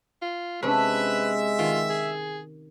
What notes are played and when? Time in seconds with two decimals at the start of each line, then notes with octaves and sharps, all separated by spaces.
0.22 F4
0.63 C3 G#3 C#4 D4 B4 E5
1.59 D#3 F4
1.90 G#4